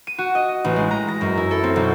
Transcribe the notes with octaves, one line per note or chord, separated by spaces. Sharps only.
D#7
F#4
D#5
A1
G#3
A#5
A#6
F#2
E4
A4
C4
B1